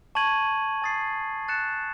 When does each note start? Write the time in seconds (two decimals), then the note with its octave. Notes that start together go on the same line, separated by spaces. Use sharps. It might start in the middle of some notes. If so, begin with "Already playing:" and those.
0.15 A5 C#6 G#6 D#7 F#7
0.82 G#5 D#6 A6 C7
1.48 F#6 A6 C#7 E7